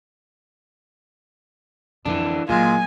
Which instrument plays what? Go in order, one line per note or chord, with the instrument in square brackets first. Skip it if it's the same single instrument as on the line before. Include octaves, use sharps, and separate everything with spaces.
[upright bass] F2 D3 [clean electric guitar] E3 D4
[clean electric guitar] A#2 [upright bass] F#3 A#3 [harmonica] G#3 F4 [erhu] G#5